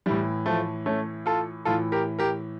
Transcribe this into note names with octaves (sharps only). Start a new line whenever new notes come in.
A2 E3 G3
F3 A3
A3 C#4
F4 A4
A2 E3 F4 A4
G4 A#4
G4 A#4